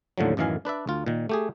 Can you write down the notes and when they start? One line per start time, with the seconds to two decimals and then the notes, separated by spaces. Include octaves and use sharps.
0.18 D#2 A2 D3 F3 F#3
0.37 A1 F#2 D#3 E3 F5 G#5
0.65 D4 B4 D5 E5
0.87 D2 F4
1.06 A#2 D#3
1.29 A3 G4 G#4